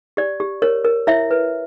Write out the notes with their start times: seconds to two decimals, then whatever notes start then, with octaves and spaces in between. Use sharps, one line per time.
0.17 G4 D5
0.40 G4
0.62 A#4 C#5
0.85 A#4
1.07 E4 C#5 E5
1.31 B4